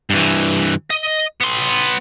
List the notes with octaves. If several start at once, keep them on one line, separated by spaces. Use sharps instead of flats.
G2 E3
D#5
B3 C6